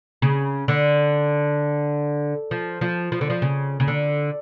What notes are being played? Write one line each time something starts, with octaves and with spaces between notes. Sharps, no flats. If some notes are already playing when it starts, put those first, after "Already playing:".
C#3
D3
F3
F3
F3
D3
F3
C#3
C#3
D3